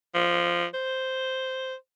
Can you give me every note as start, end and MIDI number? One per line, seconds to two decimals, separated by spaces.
0.15 0.65 53
0.74 1.75 72